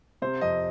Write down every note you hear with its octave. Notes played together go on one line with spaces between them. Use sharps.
C3 C5
F2 D#5